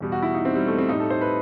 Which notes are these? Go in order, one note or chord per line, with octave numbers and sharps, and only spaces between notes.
E2 B2 G3
F#4
E4
D#4
C4
G3
A3
C4
A2 G3 D#4
A4
C5
B4